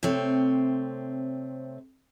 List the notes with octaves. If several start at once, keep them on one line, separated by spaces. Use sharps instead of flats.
C3 A3 C4 C#5